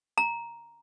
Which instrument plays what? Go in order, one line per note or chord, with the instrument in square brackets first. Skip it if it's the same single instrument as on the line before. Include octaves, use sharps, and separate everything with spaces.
[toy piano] A#5